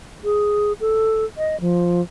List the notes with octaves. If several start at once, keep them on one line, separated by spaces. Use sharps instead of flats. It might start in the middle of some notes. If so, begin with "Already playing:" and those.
G#4
A4
D#5
F3